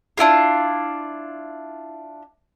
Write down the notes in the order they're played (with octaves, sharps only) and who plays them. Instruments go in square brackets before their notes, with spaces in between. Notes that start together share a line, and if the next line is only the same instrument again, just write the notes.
[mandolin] D4 E4 F4 G#4